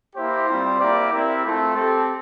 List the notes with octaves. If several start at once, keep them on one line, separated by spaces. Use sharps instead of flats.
A#3 E4 G4 C5
G3 C4 F4
A#3 E4 G4 D5
C4 E4 G4 A#4
A3 C4 F4 A4
C4 G4 A4